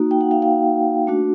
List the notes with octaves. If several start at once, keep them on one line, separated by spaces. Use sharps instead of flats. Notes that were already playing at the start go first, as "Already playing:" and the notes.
Already playing: A#3 D#4 F#4
G5
F#5
F5 G5
F5 G5
A3 D4 F#4